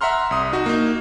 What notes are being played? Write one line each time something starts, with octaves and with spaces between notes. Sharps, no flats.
E5 F#5 A#5 C6 F6
C2 D#6
D#4 F#4
A#3 D#4